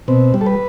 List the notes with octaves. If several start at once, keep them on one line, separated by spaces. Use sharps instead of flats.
B2 C4
G3
A4
B4